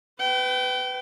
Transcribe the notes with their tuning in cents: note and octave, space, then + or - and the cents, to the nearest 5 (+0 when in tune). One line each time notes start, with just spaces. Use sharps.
B4 +25 G5 -25